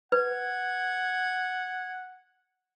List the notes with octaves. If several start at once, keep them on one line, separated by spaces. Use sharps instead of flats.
B4 F#5 G#6